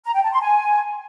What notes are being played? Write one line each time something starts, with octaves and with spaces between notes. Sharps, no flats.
A#5
G5
A5
C6
G#5